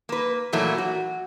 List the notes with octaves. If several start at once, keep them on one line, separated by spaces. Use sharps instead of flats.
A#3 B4
A#2 E3 F#3 A3 A#3
F#4